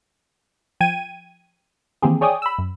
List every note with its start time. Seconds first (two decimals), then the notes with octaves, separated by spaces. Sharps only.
0.80 F3 G5 G#6 D#7
2.02 D#3 E3 A#3 C4 G4 G#4
2.21 G#4 C#5 D5 G5 G#5 D#6
2.42 B5 E6
2.58 F#2